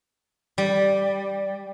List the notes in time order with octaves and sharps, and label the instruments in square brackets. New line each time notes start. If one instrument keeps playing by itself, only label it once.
[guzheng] G3